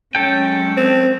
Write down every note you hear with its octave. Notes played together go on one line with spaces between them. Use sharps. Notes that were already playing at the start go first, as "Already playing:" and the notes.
F#3 G#3 C#4 A4 G5
C4